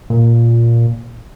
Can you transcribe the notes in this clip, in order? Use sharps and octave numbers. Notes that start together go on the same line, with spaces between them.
A#2